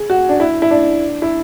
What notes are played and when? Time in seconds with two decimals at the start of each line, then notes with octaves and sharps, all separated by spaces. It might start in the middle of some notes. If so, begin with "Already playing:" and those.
Already playing: G#4
0.10 F#4
0.29 D4
0.40 E4
0.62 E4
0.71 D4
1.22 E4